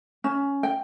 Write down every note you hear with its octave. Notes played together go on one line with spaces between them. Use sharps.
C#4
G5